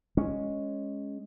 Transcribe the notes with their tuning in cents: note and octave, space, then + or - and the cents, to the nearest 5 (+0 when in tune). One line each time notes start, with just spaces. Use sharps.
G#3 +0 C#4 +0